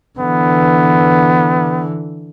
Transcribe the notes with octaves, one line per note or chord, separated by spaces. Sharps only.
D3 E3 B3